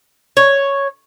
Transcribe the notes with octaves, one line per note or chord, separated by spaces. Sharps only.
C#5